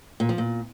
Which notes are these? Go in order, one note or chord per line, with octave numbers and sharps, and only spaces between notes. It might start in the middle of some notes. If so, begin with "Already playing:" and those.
A#2
F3
A#2